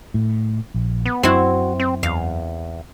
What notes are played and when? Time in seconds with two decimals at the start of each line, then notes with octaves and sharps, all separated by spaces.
0.14 A2
0.74 A#1
1.06 B3
1.23 F#2 C4 E4 F#4
1.80 C4
2.03 E2 F5